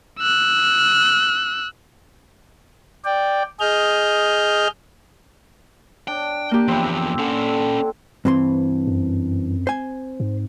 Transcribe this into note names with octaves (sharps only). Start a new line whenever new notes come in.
E6 F#6
D5 G5
G#4 D#5 F6 G6
D4 G5
A#3 G4
E2 F3 C4 E4
D3 C#4 A4
G2 E3 C4 C6
F#2
C5 G#5
G#2